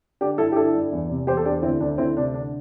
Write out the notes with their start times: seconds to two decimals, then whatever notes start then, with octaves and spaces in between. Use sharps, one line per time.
0.21 D3 D4 G4
0.38 G2 E4 A4
0.52 G4
0.56 D3 E4 A4
0.75 G2
0.92 E2
1.09 C3
1.27 E2 G4 C5
1.37 A4
1.45 E2 D4 G4
1.63 D2 C4 E4
1.80 D2 D4
1.98 D2 C4 E4
2.16 C3 D4
2.34 D3 D4